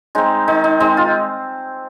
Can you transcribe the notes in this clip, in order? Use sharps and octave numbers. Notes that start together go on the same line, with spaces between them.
G#3 C4 D#4
D#3 D#4
D#4
G#3 C4 D#4
F4